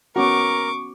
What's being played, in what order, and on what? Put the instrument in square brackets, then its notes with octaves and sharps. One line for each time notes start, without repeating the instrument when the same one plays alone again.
[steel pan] B3 C#4 F#4 [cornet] A#4 [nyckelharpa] C#6 D6